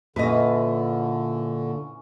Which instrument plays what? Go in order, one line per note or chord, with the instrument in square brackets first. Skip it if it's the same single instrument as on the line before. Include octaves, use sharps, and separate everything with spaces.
[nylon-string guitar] A#2 G#4 [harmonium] D3 [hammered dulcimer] E3 C#4 [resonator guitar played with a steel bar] B4 D#5